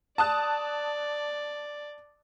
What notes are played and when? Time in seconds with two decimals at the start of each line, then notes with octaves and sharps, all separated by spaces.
0.18 D5 A5 D#6 F#6